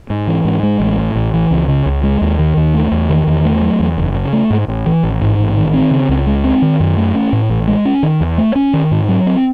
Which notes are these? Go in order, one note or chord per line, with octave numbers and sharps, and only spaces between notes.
G#2
E3
G#2
G#3
A1
A2
A1
E3
C#2
C#3
C#2
G#3
D#2
D#3
D#2
A3
E2
D#3
E2
A3
F#3
E2
F#1
C#3
A3
G#2
A1
E3
A1
G#2
A1
D#3
C4
C#3
C#2
G#3
C4
D#3
F#2
A3
C#4
A2
A1
G#3
C#4
D#3
E2
A3
C#4
D#3
G#2
F#3
C4